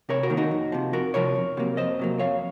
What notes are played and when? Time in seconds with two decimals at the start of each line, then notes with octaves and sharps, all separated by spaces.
0.09 C3 A#4 C#5
0.23 F#4 A#4
0.30 D#3 A#3
0.37 D#4 F#4
0.51 F2
0.72 C3 F3
0.93 F2 F#4 A#4
1.14 C3 F3 A#4 C#5
1.36 F2
1.57 C3 F#3 A#3
1.77 F2 C5 D#5
1.99 C3 F#3 A#3
2.19 F2 C#5 F5